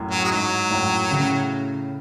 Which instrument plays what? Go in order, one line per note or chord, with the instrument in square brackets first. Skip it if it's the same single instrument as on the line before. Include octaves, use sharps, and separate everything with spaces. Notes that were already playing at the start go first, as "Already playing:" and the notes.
Already playing: [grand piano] F#2 A2
[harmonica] F#3
G#3
[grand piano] G#2 [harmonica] F#3
[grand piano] F#2 A2
A2 C#3